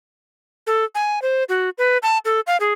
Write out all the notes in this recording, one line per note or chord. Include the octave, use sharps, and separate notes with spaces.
A4
G#5
C5
F#4
B4
A5
A4
F5
G#4